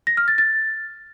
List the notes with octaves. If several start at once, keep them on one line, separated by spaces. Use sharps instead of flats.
A#6
F6
A6
A6